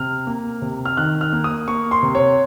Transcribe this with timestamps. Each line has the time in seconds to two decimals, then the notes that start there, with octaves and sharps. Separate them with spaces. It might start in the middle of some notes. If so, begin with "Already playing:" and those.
Already playing: C3 F6
0.27 A#3
0.62 C3
0.85 F6
0.97 D#3 F#6
1.21 F6
1.32 A#3
1.44 D#6
1.68 A#3 C#6
1.91 C6
2.03 C3
2.15 C#5